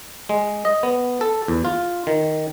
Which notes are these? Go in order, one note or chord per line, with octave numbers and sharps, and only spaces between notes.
G#3
D#5
B3
A4
E2
F4
D#3